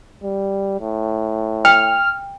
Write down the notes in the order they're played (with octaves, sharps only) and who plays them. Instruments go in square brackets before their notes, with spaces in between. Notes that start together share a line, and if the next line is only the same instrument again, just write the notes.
[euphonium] G3
A2
[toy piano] G5 [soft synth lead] F6